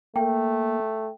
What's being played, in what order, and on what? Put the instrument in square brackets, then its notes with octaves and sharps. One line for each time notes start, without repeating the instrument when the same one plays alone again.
[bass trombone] A3 [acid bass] A#3 [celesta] G5